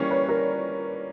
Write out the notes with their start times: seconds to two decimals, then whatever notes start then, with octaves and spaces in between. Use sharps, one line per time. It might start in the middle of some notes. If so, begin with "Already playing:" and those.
Already playing: E3 G3 A#3 C#4 C#5 D5
0.11 B4
0.29 A#4